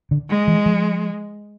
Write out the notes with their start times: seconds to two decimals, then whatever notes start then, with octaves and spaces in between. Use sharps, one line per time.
0.11 D3
0.30 G#3
0.48 E3
0.66 F3